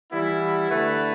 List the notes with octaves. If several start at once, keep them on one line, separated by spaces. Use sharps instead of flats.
E3 G3 B3 E4
D3 A3 E4 B4